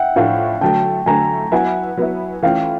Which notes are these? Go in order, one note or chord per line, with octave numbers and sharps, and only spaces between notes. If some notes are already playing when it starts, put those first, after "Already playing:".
Already playing: E5 F#5 G5
A2 F3 A3 D4 F5 G5
D3 F#3 A3 G5 A5
D3 F#3 A3 G#5 A#5
F#3 B3 E4 F#5 G#5
F#3 B3 E4
E3 A3 C#4 F4 F5 G5